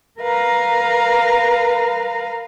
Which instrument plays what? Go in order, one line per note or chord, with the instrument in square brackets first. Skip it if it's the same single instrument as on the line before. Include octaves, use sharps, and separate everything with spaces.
[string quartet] A#4 B4 F5 A#5